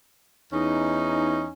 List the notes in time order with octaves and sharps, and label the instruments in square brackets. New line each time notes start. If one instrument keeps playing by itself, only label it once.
[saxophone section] E2 C#4 D#4